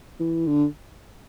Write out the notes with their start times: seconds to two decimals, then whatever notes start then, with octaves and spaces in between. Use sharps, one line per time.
0.20 E3
0.47 D3